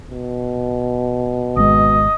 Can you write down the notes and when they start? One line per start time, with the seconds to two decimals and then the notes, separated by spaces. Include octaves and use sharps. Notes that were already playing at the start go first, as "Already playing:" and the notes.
0.12 B2
1.56 G#1 G#3 D#5